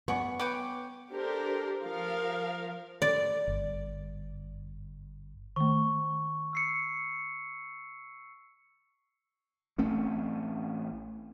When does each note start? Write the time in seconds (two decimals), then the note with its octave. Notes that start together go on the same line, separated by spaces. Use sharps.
0.08 B3 C#4 D5 F#5 C#6
0.39 B4 C#5 G5 D6
1.11 D4 G4 A4 A#4 C5
1.82 F3 A#4 F5
3.02 D5
3.47 G1
5.56 D#3 A3 C#6
6.53 E6 C7 C#7
9.78 A1 A3 C4 C#4